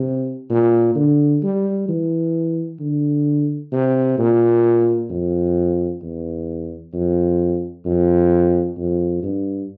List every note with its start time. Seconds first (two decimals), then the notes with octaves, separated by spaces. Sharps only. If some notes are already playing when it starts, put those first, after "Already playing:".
Already playing: C3
0.50 A#2
0.96 D3
1.43 G3
1.89 E3
2.79 D3
3.72 C3
4.18 A#2
5.10 F2
6.02 E2
6.93 F2
7.86 F2
8.77 F2
9.23 G2